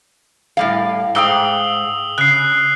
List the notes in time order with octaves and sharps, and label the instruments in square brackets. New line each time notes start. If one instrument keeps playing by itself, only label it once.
[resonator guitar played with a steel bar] A2 G3 F5
[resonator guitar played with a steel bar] G#2 F5 G5 [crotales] D#6 E6 G7
[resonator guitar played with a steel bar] C#3 [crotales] F#6 C7